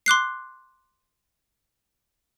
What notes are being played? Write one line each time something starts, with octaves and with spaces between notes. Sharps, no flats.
C6 D6 F#6 C7